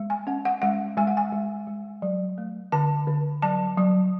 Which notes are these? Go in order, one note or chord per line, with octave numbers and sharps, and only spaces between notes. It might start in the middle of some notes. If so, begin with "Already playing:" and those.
Already playing: G#3
G#5
C#4 F#5
F#5
G#3 F#5
G#3 G#5
F#5
G#5
G#3
G#3
F#3
A3
D3 A5
D3
F#3 A5
F#3